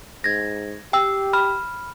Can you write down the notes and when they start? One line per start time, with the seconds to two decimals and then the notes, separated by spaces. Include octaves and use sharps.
0.24 G#2 G#6 A#6
0.93 G4 G5 E6
1.33 B5 F6